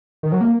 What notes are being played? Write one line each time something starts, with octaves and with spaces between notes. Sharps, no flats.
D#3
F#3
A#3